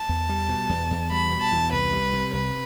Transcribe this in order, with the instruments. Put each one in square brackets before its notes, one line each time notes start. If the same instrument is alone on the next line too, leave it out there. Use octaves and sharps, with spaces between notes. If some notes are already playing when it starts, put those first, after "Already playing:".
Already playing: [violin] A5
[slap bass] E2
G3
B2
E2
E2
[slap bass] G3 [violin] B5
[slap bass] B2
[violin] A5
[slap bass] E2
[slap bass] C2 [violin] B4
[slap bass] G3
C3
[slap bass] C2 [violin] B4